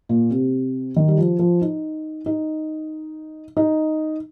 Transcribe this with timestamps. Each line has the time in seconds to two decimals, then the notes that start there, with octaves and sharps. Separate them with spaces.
0.09 A#2
0.31 C3
0.96 D#3
1.08 G3
1.18 F3
1.39 F3
1.62 D#4
2.26 D#4
3.57 D#4